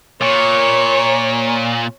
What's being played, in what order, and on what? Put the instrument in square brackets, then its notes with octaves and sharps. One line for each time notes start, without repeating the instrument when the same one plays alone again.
[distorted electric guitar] A#2 [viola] C#5